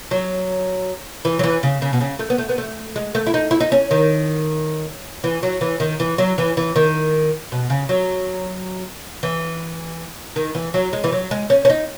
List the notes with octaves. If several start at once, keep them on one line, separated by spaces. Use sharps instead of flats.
F#3
E3
F#3
E3
C#3
C#3
B2
C#3
A3
B3
A3
B3
A3
G#3
A3
E4
D#4
E4
D#4
C#4
D#3
E3
F#3
E3
D#3
E3
F#3
E3
E3
D#3
B2
C#3
F#3
E3
D#3
E3
F#3
G#3
E3
F#3
G#3
C#4
C#4
D#4